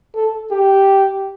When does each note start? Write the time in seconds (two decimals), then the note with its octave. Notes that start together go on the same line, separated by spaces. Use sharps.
0.15 A4
0.51 G4